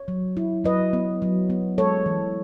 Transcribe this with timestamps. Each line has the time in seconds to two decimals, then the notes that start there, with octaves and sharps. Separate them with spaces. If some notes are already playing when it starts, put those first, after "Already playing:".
Already playing: C#5
0.08 F#3
0.37 E4
0.64 F#3 B4 D#5
0.93 B3
1.22 F#3
1.50 B3
1.78 G#3 A4 C#5
2.06 E3